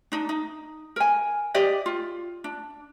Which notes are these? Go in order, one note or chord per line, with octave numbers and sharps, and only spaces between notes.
D4 D#4
D#4
A#4 G#5
G4 D5 D#5 G5
F4
D4